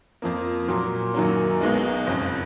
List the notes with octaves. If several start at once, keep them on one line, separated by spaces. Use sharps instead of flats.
F2 F3 A#3
A#2 F#3 A#3
F#2 D#3 F#3 A#3 C#4
B1 B2 G#3 D#4
F#1 F2 C#3